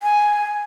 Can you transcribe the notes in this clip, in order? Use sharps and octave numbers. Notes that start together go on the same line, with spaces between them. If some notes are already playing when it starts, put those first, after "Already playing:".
G#5